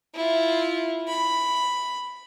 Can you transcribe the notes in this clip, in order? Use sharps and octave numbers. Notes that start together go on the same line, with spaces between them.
E4 F4
B5